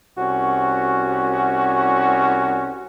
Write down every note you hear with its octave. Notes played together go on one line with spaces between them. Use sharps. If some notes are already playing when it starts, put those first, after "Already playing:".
C2 C#4 F#4